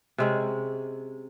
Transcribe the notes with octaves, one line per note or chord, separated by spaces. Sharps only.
C3 G#3 C#4